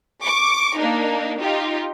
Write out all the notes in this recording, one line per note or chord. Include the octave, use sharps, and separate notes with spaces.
C#6 D6
A#3 D4 D#4
D#4 F4 G4